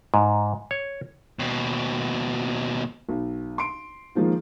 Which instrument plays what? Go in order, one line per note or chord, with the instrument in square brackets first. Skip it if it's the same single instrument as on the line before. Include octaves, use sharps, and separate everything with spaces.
[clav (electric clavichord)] G#2
C#5
[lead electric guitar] D#2 B2
[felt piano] B1
C6 D7
D#3 F3 G#3 A#3 F4